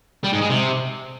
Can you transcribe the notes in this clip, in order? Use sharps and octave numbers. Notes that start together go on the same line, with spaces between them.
G3
G#2
G#3
C3